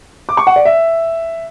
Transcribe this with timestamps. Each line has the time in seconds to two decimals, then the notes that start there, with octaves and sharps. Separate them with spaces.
0.29 D6
0.37 C#6
0.47 F#5
0.56 D5
0.65 E5